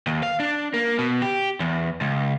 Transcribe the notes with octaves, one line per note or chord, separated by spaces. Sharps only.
D#2
F5
D4
A#3
B2
G4
E2
C#2